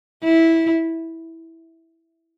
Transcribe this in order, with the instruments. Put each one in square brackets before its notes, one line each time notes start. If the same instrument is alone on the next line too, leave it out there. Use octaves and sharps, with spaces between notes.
[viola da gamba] E4